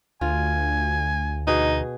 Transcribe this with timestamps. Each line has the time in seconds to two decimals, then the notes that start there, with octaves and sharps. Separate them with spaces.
0.21 D2 F4 G#5
1.47 B2 D#4 G#4